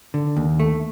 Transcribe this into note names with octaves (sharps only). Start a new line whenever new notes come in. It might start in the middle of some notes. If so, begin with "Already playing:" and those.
D3
D#2
A3